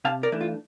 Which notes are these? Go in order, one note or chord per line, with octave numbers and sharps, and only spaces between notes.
C3 F5 A5
A#4 D5
E3 A3 D4
F4